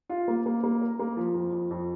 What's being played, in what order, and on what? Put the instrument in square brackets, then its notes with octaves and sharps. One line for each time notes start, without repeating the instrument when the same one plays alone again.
[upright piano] F4
A#3
A#3
A#3
A#4
A#3
F3
F2
F2
F2